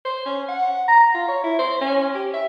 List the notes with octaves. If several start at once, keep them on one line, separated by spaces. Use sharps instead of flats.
C5
C#4
F#5
A#5
F4
C#5
E4
C5
C#4
G4
E5